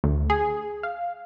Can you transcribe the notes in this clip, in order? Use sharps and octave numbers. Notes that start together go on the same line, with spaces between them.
D2
G#4
F5